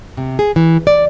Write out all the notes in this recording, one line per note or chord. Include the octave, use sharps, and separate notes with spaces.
C3
G#4
E3
D5